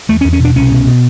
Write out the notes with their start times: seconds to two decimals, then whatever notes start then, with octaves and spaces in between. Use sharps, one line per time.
0.09 E2 A3
0.21 C#4
0.24 E2
0.33 C#4
0.40 B2
0.45 D4
0.56 C2 C#4
0.71 B2
0.87 B2